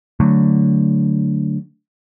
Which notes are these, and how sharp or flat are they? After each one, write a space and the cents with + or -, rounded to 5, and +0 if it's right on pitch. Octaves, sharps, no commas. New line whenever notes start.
D3 +0 F#3 +0 A3 +0